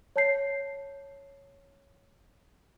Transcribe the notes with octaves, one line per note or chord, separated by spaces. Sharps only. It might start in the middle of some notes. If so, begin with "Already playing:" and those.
C#5 A5 G6 C7